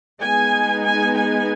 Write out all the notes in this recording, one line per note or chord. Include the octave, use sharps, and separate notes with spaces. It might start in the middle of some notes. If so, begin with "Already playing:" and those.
G#3 B3 D#4 G#5
G#5
G#5